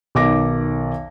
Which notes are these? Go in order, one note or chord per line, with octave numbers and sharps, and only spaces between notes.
B1 D#3 D6 A#6